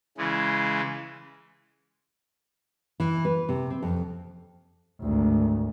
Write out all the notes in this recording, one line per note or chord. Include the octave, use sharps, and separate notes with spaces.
C#3 E3 G#3
E3
B4
C3
C4
F2
G#1 D2